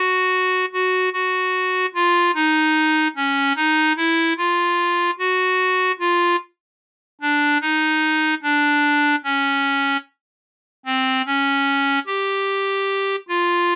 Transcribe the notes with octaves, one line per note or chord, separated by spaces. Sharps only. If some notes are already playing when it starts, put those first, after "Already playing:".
Already playing: F#4
F#4
F#4
F4
D#4
C#4
D#4
E4
F4
F#4
F4
D4
D#4
D4
C#4
C4
C#4
G4
F4